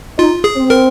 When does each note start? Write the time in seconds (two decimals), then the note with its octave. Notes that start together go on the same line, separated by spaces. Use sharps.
0.19 D#4 F4
0.44 G#4
0.57 C4
0.70 A#4